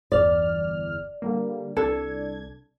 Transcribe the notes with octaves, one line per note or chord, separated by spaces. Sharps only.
G1 E2 D5 F6
D3 G3 A#3
C2 D4 A4 G#6